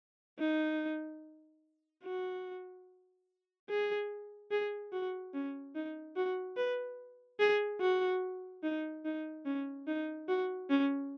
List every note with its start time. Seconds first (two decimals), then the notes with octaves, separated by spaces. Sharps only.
0.39 D#4
2.04 F#4
3.69 G#4
4.51 G#4
4.92 F#4
5.34 C#4
5.75 D#4
6.16 F#4
6.57 B4
7.40 G#4
7.81 F#4
8.63 D#4
9.05 D#4
9.45 C#4
9.87 D#4
10.28 F#4
10.70 C#4